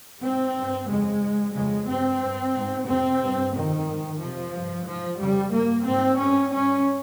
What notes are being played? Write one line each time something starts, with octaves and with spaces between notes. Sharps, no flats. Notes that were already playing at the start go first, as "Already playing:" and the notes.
G#2 C4
G2
F2 C#3 G#3
G#2
F2 C#3 G#3
G2 C4
G2
G#2
F2 C3 C4
G2
F2 C3 D#3
G#2
F2 C3 F3
G2
G#2 F3
F2 C#3 G3
G2 A#3
G#2 C4
G2 C#4
G2 C#4